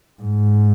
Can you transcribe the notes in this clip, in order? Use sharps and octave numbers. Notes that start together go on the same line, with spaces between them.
G#2